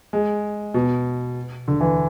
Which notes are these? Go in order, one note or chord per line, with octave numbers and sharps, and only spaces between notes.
G#3
B2
D3
E3